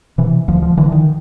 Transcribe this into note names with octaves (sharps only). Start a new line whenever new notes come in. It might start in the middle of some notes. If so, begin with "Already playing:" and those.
C3 E3
D2 F3
F3
D3 E3
D#3